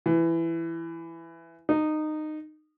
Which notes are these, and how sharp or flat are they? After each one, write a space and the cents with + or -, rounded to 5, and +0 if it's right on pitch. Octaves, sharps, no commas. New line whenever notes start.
E3 +15
D#4 -20